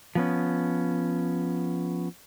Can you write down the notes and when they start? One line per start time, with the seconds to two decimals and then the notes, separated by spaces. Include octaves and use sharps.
0.15 F3 B3 C#4